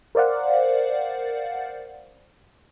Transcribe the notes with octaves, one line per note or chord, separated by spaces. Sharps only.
A#4 C5 D5 F5 F#5